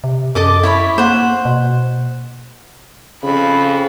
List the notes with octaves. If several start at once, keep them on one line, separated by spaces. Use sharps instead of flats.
C3
F#2 A4 D#5 D6
E4 C#5 B5
A#3 C5 F#5
B2
F2 C#3 B5